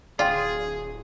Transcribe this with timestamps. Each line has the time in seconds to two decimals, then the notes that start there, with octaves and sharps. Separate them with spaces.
0.19 D1 F4 G#4 D5 F5 G5